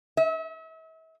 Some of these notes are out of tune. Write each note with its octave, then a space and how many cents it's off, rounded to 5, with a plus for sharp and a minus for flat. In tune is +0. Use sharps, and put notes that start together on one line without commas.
E5 -40